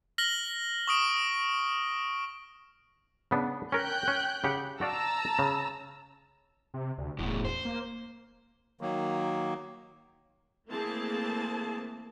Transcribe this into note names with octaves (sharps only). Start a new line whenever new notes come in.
F6 A#6 F#7 G7
C#6 D#6 D7
C#3 B3 D4
C#4 A#4 G5 F#6 G6
C#4
C#3 G4 F#5
F#4 D5 F5 A5 A#5 E6
C#3
C3
D2
E1 E2 A2
C5
A#3
D#3 F#3 A#3
E3 A3 A#3 C4 G#4 A5